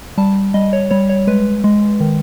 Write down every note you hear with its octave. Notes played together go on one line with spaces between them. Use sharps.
G3 A5
G3 D#5
C#5
G3 C#5
C#5
G#3 B4
G#3
D#3